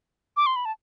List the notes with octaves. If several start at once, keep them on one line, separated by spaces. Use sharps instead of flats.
D6
C6
B5
A5